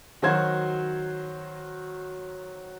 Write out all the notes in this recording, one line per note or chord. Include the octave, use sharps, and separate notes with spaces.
D#3 F#3 F#4 C5 G#6